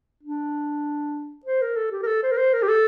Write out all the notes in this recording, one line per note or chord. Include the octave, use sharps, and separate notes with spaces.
D4
C5
A#4
A4
G4
A#4
A4
C5
A#4
C5
A#4
G4
A4